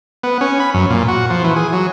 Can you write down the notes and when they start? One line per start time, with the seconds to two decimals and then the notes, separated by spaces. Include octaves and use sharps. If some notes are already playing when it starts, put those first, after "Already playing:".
0.23 B3
0.41 C#4
0.60 B5
0.74 F#2
0.90 A#2
1.08 F#4
1.30 F3
1.44 E3
1.56 G#4
1.73 F#3